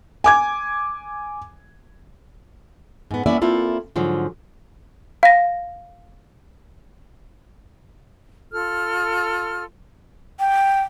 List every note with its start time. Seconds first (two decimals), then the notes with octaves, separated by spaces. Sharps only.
0.24 G#5 D6 G#6
3.11 G#2 B3
3.26 A#3 B3 C#4 E4 D5 E5
3.42 A#3 C4 E4 F4 A4
3.96 G#2 D3 F3 F#3
5.23 F5 A#6
8.52 F4 A4 F6
10.40 G5